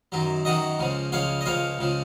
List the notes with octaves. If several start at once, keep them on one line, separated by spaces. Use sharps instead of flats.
F#2 D#3 F#3
F#2 D#3 F#3 D#5 F#5
C#2 C#3 F3
C#2 C#3 F3 C#5 F5
D#5
C#2 C#3 F3 C#5 F5
C#2 C#3 F3